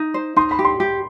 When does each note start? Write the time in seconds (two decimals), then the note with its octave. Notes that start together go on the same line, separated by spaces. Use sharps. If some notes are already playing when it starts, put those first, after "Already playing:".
Already playing: D#4
0.14 C5
0.36 D#4 C6
0.51 B5
0.59 G4
0.65 C6
0.80 G4